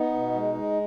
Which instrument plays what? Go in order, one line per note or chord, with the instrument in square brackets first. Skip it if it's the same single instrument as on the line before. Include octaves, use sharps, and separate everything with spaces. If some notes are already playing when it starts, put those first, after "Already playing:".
Already playing: [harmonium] B3 D#4
B2
G#3
G#3